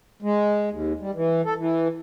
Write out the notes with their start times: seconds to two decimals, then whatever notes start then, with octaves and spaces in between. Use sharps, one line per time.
0.22 G#3
0.70 D#2
1.00 G3
1.15 E3
1.45 A4
1.58 E3